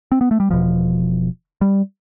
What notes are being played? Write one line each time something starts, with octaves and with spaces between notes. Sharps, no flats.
C4
B3
A3
G3
E1 E2 B2 F3
G3